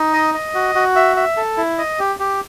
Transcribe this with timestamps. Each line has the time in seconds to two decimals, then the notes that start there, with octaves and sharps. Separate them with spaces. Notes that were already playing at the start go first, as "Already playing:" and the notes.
Already playing: D#4
0.13 D#5
0.35 D#5
0.55 F#4
0.75 F#4
0.96 E5
1.16 E5
1.37 A4
1.57 E4
1.78 D#5
1.99 G4
2.20 G4